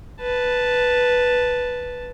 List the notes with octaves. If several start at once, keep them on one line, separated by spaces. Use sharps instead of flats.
B4 A5